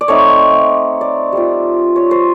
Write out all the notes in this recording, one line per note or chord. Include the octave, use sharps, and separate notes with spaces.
D5
A3 C4 D#4 C#5
D5
G3 C4 F4
C#5
C5